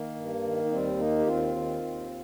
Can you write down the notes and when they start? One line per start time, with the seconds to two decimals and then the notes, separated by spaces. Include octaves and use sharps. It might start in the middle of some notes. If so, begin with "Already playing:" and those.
Already playing: D#3 A#3
0.15 G2
0.43 D#3
0.65 D#4
0.71 D#2 G3 C4
0.99 D#3 A#3 D#4
1.18 G4
1.27 D#2 C4 F4
1.55 D#3
1.83 D#2